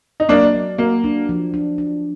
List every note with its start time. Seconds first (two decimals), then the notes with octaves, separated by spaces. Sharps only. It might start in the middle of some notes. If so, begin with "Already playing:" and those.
0.20 D#4
0.29 F#3 A#3 D4
0.54 F#3
0.78 A#3 F#4
1.04 D4
1.29 F3
1.54 D4
1.78 D4